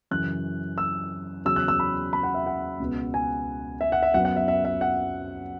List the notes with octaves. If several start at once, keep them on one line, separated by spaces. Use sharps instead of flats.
F#2 C#3 E3 F#6
E6
E2 C#3 F#3 C#4 E6
F#6
E6
B5
B5
F#5
E5
F#5
C#2 B2 B3
G#5
E5
F#5
E5
F#2 F#3 B3 F#5
F#5
E5
E5
E5
F#5